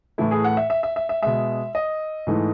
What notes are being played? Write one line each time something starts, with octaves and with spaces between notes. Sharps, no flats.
A2 E3 A3 E4
G#4
F#5
E5
E5
E5
E5
E5
B2 G#3 E5
D#5
G#2 E3 A3